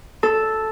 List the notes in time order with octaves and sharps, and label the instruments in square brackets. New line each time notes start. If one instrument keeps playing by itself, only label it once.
[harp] A4